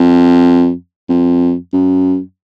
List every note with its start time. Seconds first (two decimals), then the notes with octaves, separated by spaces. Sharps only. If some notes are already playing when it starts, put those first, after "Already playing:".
Already playing: F2
1.09 F2
1.73 F#2